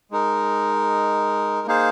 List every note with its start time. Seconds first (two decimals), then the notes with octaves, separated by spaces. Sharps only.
0.11 G#3 D#4 A#4
1.67 A#3 D#4 G#4 C5 F5